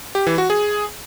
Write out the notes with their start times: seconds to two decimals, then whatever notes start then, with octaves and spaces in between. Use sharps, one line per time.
0.15 G4
0.27 E3
0.38 F#4
0.50 G#4